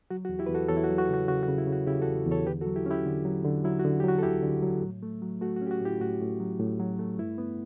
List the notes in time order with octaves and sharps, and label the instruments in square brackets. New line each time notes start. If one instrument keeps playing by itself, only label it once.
[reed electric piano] F#3 F#4
F#4
E2
E4 G4
B4
E2
F#4 A4
E2 A4 C#5
E4
F#4
F#3
F#4
C#3 F#4
C#3 F#4
F#4
C#3
E4
C#3
F#4
C#3 E4 G4
F#4 A4
E2
E2
A4 C#5
D3 G4 B4
F#4 A4
F#3
E4 G4
C#4 E4 G4
D3
F#3
D3
F#3 E4
F#4
D3
G4
F#3 F#4
A4
D2 E4 G4
D3
F#3
A2
A3
F#3
A3 F#4
F#4
C#4 G4
F#4
A2 E4 G4
A2 F#4
A2
F#3
A2
F#3
A3
G2 E4
B3